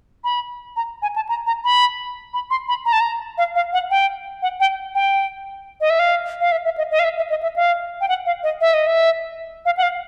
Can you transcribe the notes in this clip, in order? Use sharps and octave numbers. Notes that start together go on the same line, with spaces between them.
B5
A#5
G#5
A5
A#5
A#5
B5
B5
C6
B5
A#5
A5
A#5
F5
F5
F#5
G5
F#5
G5
G5
D#5
E5
F5
F5
E5
E5
D#5
D#5
F5
E5
E5
D#5
E5
F5
G5
F#5
F5
D#5
E5
D#5
E5
F5
F#5
F5